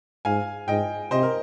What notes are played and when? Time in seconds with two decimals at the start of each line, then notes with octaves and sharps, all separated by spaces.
0.25 G#2 F5 G#5
0.68 G#2 D#5 G5
1.11 C3 C5 D#5
1.23 A#4